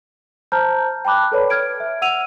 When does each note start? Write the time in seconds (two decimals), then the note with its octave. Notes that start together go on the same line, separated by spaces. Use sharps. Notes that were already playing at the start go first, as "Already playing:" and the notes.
0.52 C5 A5 A#5 F6 G6
1.05 G5 A5 B5 D6 F#6
1.32 A4 B4 C#5 D5 B5
1.50 F6 G#6 D7
1.80 E5
2.02 F#5 E6 D#7 F7